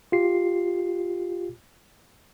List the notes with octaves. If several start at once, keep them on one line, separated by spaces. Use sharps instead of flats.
F4 G4 C7